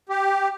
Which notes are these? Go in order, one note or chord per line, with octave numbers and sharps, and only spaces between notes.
G4